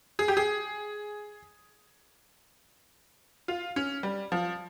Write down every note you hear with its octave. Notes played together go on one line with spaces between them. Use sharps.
G#4
G4
G#4
F4
C#4
G3
F3